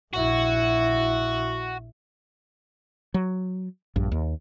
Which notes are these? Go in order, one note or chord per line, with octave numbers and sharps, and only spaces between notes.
A#1 E4 F#4
F#3
A#1 G2
D#2